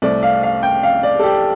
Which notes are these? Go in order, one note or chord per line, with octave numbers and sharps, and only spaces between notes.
C2 C3 A3 D5
F5
F5
G5
F5
D5
A4
G4